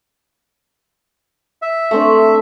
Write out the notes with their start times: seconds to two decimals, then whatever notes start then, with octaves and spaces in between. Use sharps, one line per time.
1.62 E5
1.91 A3 C4 D4